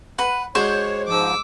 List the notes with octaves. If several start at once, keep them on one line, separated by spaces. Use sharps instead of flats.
B4 F#5
G#3 D4 F#4 C5 C#5
G#2 F3 D6 E6